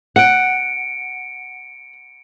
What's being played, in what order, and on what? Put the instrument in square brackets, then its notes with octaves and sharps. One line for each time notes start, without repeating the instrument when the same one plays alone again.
[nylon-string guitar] F#5 [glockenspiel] C#7 D7